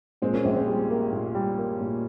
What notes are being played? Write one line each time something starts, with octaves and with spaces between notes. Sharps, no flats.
A#2 G#3 C4
A#3 C#4
A#1 G#3 C4
G#3 C4
G3
A#3
A#2
G3
A#3
A#2